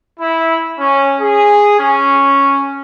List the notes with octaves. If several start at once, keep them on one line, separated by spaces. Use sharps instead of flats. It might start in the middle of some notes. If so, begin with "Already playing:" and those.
E4
C#4
G#4
C#4